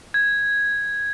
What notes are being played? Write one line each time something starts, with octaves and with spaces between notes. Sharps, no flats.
G#6